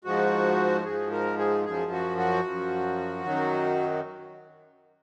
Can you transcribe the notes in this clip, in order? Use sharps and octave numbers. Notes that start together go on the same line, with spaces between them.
G#2 F3 F#4
G#2 F3 G#4
A#4
G#4
F#2 F3 G#4
F#4
F#4
F#2 F3
F#2 D#3 F#3